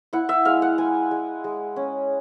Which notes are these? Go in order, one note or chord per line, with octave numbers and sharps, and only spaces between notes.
E4 F#5
E5
G#3 F5
F#5
G#3 G#5
G#3
G#3
C#4